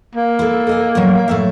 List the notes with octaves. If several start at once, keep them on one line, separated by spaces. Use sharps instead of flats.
A#3
E4 A4
A4 D#5 G#5
A2 F#3
A2 F#3 E5